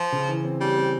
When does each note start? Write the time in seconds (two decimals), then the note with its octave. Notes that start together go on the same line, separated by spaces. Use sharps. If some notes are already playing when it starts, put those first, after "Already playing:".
Already playing: F3
0.12 C#3
0.29 E3
0.45 C4
0.61 G3 C#4
0.77 C4